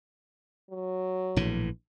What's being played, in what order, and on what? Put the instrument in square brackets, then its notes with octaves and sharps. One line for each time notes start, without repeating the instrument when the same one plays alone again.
[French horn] F#3
[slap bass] A#1 A2 E3